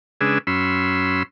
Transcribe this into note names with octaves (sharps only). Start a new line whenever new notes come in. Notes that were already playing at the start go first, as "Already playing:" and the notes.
C#3 G#3 D4 G#4 B4 E6
F#2 C#4 B5 C6 E6